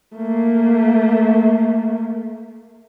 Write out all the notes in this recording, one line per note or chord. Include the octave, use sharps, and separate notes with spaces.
A3 A#3